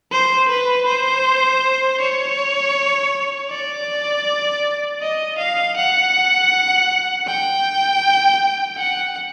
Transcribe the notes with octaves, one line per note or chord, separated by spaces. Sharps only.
C5
B4
C5
C#5
D5
D#5
F5
F#5
G5
F#5